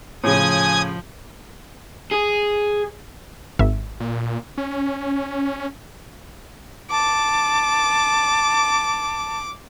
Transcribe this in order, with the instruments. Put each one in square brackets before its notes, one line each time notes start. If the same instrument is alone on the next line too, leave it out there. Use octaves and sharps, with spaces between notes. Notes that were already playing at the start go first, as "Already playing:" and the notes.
[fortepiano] A2 C#3 [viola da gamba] F3 [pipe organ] G#5 D#6 G#6
[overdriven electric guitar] G#4
[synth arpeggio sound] G#1 E5
[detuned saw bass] A#2
C#4
[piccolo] A5 [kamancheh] D6